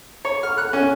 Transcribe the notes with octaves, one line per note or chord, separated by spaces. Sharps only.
C#5
F6
F#6
C#4